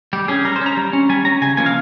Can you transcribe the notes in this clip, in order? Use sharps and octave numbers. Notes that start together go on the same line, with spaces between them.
G3 G4
C#4 G#4
G3 A#4
C5
C#4
A#5
G3
C#4
G3 G#5
C#4 A#5
C#3 G#5
F3 A#3 C#4 G#5
F5